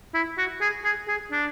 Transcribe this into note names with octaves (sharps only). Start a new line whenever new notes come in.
E4
F#4
G#4
G#4
G#4
D4